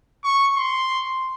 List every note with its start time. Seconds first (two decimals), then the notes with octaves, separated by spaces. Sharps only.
0.24 C#6
0.56 C6